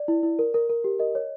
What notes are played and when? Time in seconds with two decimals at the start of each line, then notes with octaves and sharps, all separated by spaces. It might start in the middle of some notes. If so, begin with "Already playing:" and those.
Already playing: D5
0.08 E4
0.23 E4
0.39 A#4
0.54 A#4
0.69 A#4
0.84 G4
0.99 A#4 D#5
1.15 C#5